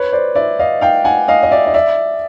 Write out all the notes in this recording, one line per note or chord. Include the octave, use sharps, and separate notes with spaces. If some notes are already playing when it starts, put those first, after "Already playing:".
Already playing: B4 C#5
C5 D5
D5 E5
D#5 F5
F5 G5
F#5 G#5
D#5 F5
D#5
D5 E5
D#5
D5 E5